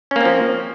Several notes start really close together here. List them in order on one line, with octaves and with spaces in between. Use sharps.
C#4 A#3 C4 F3